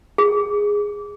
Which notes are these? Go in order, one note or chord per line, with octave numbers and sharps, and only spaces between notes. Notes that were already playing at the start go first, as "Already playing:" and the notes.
G#4